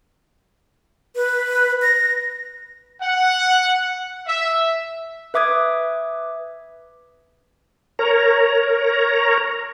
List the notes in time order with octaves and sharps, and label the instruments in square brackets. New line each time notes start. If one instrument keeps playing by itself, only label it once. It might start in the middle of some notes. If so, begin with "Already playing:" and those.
[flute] B4
A#6
[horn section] F#5
E5
[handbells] B4 E5 D6 D#6 G#6
[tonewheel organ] A#4 C#5 A#5